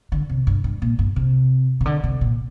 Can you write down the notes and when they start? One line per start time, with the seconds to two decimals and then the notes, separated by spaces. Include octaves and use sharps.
0.12 D3
0.29 C3
0.47 G2
0.64 G2
0.82 A#2
0.99 G2
1.16 C3
1.81 C3
1.86 D3
2.04 C3
2.21 A#2